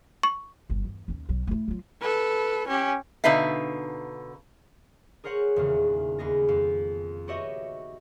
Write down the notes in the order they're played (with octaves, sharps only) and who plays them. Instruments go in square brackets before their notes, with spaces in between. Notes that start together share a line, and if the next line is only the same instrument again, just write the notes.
[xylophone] C#6
[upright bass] G1 F2
E2
D#2 C#4
B1 F#3
A3 E4
F#3 F4
[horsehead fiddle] A4 B4
C#4 G4
[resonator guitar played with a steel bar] B2 D3 D#4 B4 E5 F5
[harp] G#4 A#4 C5 C#5 F#5
D#1 E2 C#3
D#2 B3 G#4 A#6
F2
F#4 G4 B4 C#5 D#5 E5